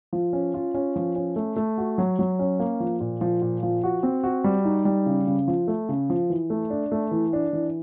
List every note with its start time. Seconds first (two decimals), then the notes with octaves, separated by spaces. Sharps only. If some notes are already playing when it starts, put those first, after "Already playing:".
0.13 F3
0.33 C#4
0.54 F4
0.74 C#4
0.96 F3
1.15 C#4
1.36 A3
1.57 A3
1.78 F#4
1.98 F#3
2.19 F#3
2.39 C#4
2.59 A#3
2.80 F3
3.00 A#2
3.21 F3
3.42 A#2
3.63 F3
3.84 F#4
4.03 C4
4.23 F#4
4.44 G3
4.65 D#4
4.85 G3
5.06 C#3
5.27 C#3
5.48 F3
5.68 A3
5.89 C#3
6.10 F3
6.30 E3
6.50 A3
6.70 D4
6.92 A3
7.11 E3
7.33 D4
7.53 E3